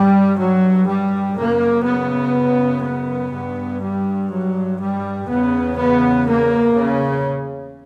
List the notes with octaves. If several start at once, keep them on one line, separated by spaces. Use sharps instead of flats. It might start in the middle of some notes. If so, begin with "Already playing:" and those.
Already playing: G2 G3
F#3
G3
F#2 C#3 A#3
B3
B3
G2
G3
F#3
G3
E2 C#3 B3
B3
A#3
C#3